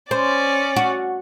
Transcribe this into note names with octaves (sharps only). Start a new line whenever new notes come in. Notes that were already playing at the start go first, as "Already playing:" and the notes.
C#4 C5 D5
F#4